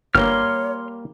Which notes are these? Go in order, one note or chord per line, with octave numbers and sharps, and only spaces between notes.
G1 G3 A#3 C#5 C6 F6